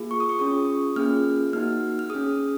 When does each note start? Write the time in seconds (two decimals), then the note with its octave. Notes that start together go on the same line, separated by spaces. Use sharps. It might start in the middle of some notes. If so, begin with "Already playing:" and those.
Already playing: A#3 F4 G#4
0.11 C#6
0.20 D#6
0.29 C#6
0.39 C#4 F4 G#4 D#6
0.96 A#3 C#4 F4 G#4 F6
1.53 A#3 D#4 F#4 F6
1.99 F6
2.10 G#4 D#6
2.15 C#4